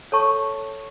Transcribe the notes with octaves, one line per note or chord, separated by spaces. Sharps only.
A4 C#5 A5 C#6